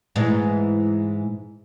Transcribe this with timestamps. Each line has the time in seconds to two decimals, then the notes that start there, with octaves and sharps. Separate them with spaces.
0.16 G#2 E3 G#3